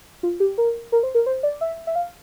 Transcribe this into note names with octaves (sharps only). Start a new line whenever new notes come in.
F4
G4
A#4
A#4
C5
A#4
C5
D5
E5
E5
F5